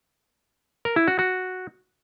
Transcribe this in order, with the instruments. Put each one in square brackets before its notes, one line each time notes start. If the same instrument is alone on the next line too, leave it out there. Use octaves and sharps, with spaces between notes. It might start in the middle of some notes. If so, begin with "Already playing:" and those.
[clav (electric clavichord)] A#4
E4
F#4
F#4